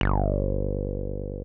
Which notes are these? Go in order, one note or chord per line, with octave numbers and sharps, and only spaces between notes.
G1